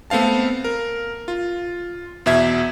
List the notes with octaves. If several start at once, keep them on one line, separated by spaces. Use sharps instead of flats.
A3 B3 C4 F5 A5
A#4
F4
E2 B2 E5 G#6